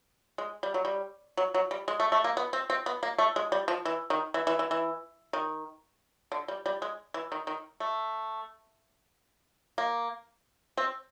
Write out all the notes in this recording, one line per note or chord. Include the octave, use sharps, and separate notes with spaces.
G#3
G3
F#3
G3
F#3
F#3
G3
G#3
A3
A3
A#3
B3
C4
C4
B3
A#3
A3
G#3
G3
F3
E3
D#3
E3
E3
E3
E3
D#3
D3
G3
G3
G#3
E3
D#3
D#3
A3
A#3
C4